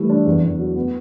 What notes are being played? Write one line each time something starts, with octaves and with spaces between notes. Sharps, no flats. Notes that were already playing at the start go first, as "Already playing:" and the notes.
Already playing: E3 G3 A3
D4
E2
E2
F#3
B3